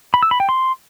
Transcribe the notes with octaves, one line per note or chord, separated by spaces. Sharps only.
B5
E6
B5
G5
C6